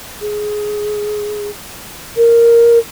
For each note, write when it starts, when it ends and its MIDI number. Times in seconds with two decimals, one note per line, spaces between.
0.21 1.50 68
2.16 2.78 70